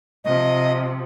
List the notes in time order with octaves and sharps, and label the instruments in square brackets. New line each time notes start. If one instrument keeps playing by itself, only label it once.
[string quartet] C3 F3 [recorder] D#5